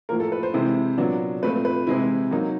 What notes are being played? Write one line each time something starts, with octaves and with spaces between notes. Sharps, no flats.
A2 F3 A#3 A#4
A4
B4
C5
C3 E3 G#3 C4 E4
A#2 F#3 B3 D4
A#2 F3 A3 C4 B4
B4
C3 E3 G#3 C4 E4
F#3 A#3 D#4